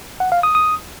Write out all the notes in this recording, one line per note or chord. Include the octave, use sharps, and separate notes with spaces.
F#5
F5
D#6
D#6